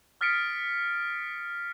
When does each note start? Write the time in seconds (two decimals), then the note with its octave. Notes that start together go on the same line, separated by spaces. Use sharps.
0.21 D#6 F6 A6 B6 C#7 D7